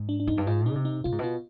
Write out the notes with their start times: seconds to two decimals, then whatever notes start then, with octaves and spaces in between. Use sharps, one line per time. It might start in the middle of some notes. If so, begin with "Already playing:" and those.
Already playing: G#2
0.09 D4
0.20 D4
0.27 F2 D#4
0.38 G2
0.47 G#2 F4
0.66 D3 D#4
0.75 C3
0.85 D#4
1.04 B2 F4
1.12 G#2
1.19 B2 F4